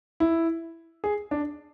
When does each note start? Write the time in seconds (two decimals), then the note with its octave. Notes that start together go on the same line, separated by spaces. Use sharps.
0.20 E4
1.04 G#4
1.31 D4